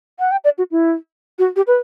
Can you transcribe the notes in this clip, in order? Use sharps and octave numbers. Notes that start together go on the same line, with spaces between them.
F#5
G5
D5
F#4
E4
F#4
G4
B4